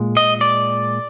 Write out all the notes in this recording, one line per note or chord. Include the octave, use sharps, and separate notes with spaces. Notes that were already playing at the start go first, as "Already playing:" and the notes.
Already playing: A#2 G#3
D#5
D5